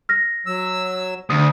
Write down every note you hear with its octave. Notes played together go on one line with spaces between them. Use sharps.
F6 A#6
F#3 E6
D2 D3 D#6